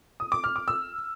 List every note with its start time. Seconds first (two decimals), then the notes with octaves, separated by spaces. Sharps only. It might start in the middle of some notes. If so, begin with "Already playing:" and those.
0.20 D#6
0.32 D6
0.44 F6
0.56 D6
0.68 E6